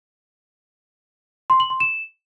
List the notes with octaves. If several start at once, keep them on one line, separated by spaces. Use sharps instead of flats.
C6
F#7
C6
E7